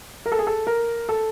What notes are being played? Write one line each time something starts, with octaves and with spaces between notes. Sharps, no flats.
A#4
A4
G#4
A4
A#4
A4